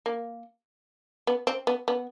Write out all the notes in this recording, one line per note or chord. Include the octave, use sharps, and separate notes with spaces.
A#3
B3
C4
B3
B3